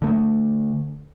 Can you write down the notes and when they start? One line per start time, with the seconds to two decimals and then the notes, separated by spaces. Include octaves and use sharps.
0.02 D3 A3